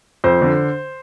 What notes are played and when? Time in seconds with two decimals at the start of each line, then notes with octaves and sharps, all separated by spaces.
0.24 F2 C5
0.42 D3